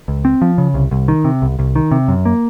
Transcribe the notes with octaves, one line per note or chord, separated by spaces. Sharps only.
C#2
C4
F3
C#3
C2
C2
D#3
C3
C2
C2
D#3
C3
F#2
A#3